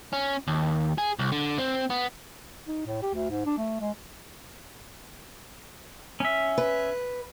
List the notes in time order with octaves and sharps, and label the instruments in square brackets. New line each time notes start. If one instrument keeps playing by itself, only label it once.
[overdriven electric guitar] C#4
D#2
G#4
C2
D3
C4
B3
[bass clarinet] D#4
A2
G4
D2
G#2
D4
A3
G#3
[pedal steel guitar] C#4 E5
[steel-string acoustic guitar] B4